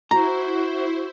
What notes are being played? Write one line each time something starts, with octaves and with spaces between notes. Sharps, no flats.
E4 F#4 C5 A#5